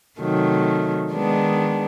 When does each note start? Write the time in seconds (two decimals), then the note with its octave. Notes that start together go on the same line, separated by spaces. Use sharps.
0.20 C3 D#3 F#3 A3
1.12 D#3 G#3 B3 D4